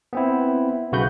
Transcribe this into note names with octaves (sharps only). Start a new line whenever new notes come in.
B3 C4 E4
B1 C#3 F#4 B4 G6